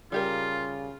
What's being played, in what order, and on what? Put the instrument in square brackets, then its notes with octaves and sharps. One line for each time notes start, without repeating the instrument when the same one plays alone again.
[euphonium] C#3 [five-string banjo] G3 G4 A#4 [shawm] F4